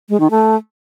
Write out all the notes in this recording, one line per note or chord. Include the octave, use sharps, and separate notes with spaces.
G#3
D#3
A3